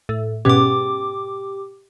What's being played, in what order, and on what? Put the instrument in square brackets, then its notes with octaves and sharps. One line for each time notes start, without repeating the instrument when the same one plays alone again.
[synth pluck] A2
[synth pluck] G#2 B2 C#4 [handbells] G4 D6